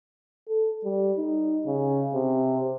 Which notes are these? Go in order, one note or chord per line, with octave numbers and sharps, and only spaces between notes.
A4
G3
D#4
C#3
C3